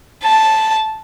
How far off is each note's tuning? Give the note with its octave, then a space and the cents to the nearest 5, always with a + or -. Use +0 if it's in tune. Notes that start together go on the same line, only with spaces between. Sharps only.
A5 -5